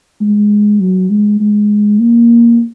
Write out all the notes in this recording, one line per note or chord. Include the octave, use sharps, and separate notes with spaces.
G#3
F#3
G#3
G#3
A#3